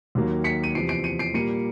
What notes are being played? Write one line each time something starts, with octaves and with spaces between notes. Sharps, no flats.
D#2 D#3 F#3 A#3
B6 C#7
D#7
E2 C3 F3 C7 D7
C7 D7
C#7 D#7
C7 D7
A#2 G3 A#3 C#7 D#7